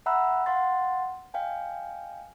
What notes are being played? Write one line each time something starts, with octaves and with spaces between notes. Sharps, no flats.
E5 F#5 A#5 B5 E6 F#6
F5 F#5 C6 A6
D#5 F5 G5 G#5